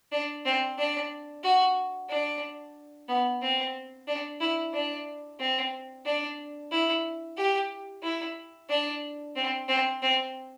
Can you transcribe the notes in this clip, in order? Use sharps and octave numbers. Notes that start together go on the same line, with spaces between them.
D4
C4
D4
F#4
D4
B3
C4
D4
E4
D4
C4
D4
E4
G4
E4
D4
C4
C4
C4